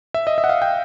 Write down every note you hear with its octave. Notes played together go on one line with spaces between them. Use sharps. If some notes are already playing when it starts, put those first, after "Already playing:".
E5
D#5
E5
F#5
F5
G5